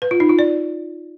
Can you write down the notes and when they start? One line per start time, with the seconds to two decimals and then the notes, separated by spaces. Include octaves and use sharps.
0.02 B4
0.11 F4
0.20 D#4
0.29 F4
0.39 D5